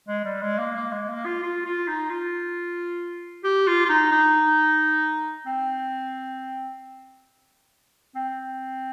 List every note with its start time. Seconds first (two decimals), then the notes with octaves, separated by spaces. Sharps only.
0.08 G#3
0.25 G3
0.41 G#3
0.58 A#3
0.76 A#3
0.92 G#3
1.09 A#3
1.25 F4
1.43 F4
1.65 F4
1.87 D#4
2.10 F4
3.44 G4
3.67 F4
3.85 F4
3.89 D#4
4.11 D#4
5.46 C4
8.15 C4